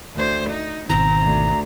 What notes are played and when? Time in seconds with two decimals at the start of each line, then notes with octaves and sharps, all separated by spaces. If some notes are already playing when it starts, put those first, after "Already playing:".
0.15 D2 C5
0.51 D#4
0.90 G#1 B2 D#3 C4 A#5
1.23 D2